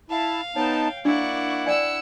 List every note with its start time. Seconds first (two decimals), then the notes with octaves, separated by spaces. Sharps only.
0.10 E4 F5 A5
0.56 B3 D#4 C#5 G5 A5
1.05 A#3 D4 E4 D5 F#5 C#6
1.66 D5 G5 G#5 E6 C#7